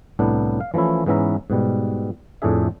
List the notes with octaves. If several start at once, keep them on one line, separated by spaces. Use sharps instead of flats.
C2 A2 B3 D4
F5
E3 F3 A3 C#4 E4
G#2 E3 B3 C#4 E5 A#5
G#2 B2 G3
F2 A2 A3 D4 G#4 E5